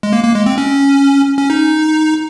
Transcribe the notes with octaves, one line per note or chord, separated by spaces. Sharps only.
G#3
A#3
A#3
G#3
C4
C#4
C#4
D#4